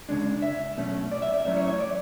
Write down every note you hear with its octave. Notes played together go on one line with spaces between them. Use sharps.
C#3 G#3 D4
E5
B2 F#3 A3 C#4
D5
E5
D5
A2 F#3 A3 C#4 E5
C#5
C#5
D5